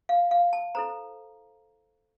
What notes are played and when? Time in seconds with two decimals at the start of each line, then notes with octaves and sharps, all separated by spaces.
0.09 F5
0.31 F5
0.53 A5
0.75 E4 A4 C5 A#5